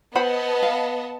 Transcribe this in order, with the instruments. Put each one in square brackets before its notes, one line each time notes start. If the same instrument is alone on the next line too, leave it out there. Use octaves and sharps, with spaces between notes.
[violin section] B3 D#5 A5 [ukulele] C5 F#5 B5
[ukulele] F5